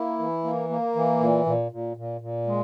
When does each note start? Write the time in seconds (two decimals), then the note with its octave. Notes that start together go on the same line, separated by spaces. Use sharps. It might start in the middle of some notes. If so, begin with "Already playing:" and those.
Already playing: A#3 E4
0.19 E3
0.44 A#3
0.69 A#3
0.96 E3
1.20 A#2
1.46 A#2
1.72 A#2
1.97 A#2
2.21 A#2
2.47 G#3